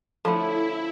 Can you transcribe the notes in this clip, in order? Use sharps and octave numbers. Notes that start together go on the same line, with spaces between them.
D3 F3 A3 C#4 E4 A4 F#5 B5